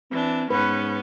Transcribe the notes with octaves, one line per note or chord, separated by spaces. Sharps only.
E3 C4 D4
G#2 B3 C#4 B4